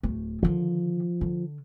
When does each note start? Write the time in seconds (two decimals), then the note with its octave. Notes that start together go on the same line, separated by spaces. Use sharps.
0.03 D1 A3
0.43 D3 D#3 F3
1.21 D3